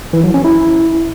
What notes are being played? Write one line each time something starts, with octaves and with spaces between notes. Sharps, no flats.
E3
F#3
C#4
E4